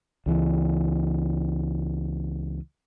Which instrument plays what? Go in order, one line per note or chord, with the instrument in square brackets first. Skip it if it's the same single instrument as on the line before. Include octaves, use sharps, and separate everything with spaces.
[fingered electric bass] C#2 E3